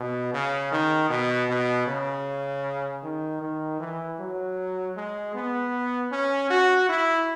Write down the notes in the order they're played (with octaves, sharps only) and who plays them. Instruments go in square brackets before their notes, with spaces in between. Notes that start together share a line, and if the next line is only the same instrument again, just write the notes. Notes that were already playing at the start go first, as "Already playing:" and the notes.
Already playing: [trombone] B2
C#3
D#3
B2
B2
C#3
D#3
D#3
E3
F#3
G#3
B3
C#4
F#4
E4